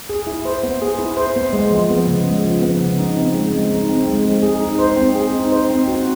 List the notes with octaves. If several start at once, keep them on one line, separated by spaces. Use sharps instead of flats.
G#4
E4
C5
B3
G#4
E4
C5
B3
G#3
F3
B3
C#3
G#3
F3
B3
C#3
D#4
C4
G#3
G#3
D#4
C4
G#3
G#3
G#4
D#4
C5
C4
G#4
D#4
C5
C4
F#4